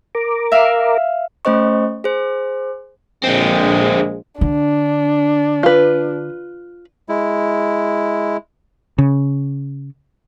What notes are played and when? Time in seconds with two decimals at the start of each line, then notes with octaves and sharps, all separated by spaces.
0.15 A#4 A#5 D6
0.52 E5 F5
1.45 A3 C#4 C5 D#5 C#6
2.04 G#4 C5
3.24 A#1 D3 G#3 C4
4.41 D3 D4
5.63 F4 B4
7.09 G#3 E4
8.98 C#3